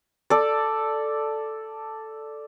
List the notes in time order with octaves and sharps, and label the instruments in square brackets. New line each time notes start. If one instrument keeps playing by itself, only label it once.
[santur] A4 D5